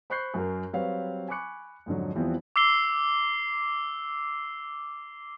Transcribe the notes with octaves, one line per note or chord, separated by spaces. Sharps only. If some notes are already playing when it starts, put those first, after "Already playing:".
C5 B5 C#6 F#6 G6 C7
F#2 F#4 A#4
F#3 G3 C4 B4 C#5 F5
G#5 B5 C#6 D6 F#6 C#7
F2 G#2 D3 F#3
E2 E3 F3 G3 B3 C4
D6 E6 C7 G7